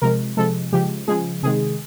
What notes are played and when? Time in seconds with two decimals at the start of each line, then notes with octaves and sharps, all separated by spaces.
0.02 C3 F3 G#3 A#4
0.37 C3 F3 G#3 A4
0.72 C#3 F3 G#3 G4
1.08 C#3 F3 G#3 G#4
1.43 C3 D#3 G#3 G#4